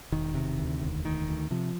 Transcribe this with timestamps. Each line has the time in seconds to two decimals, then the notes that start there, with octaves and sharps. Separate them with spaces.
0.12 E1 D#3
0.34 C3
0.58 D2
0.81 E1
1.04 D2 D#3
1.28 D2
1.51 C3 F3